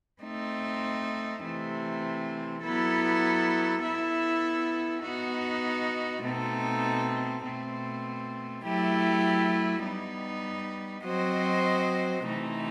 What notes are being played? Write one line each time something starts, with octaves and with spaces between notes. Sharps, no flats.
A3 C4 D#4
C3 E3 A3 C4
F#3 B3 E4 A4
B3 E4 A4 E5
B3 D#4 F#4
B2 A3 C4 D#4 A4
B2 A3 C4
F#3 A3 E4 G4
G3 B3 D#4
F#3 C4 F#4 C5 D#5
C3 E3 A3 D#4